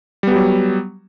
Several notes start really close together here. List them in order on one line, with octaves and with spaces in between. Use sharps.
G3 B3 G4 F#3